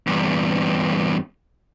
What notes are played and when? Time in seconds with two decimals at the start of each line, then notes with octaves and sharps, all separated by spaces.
0.07 E2 G2